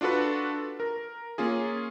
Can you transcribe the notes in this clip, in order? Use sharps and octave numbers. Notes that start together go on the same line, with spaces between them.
D4 F4 F#4 A4 B4
A#4
A#3 C#4 F4 G#4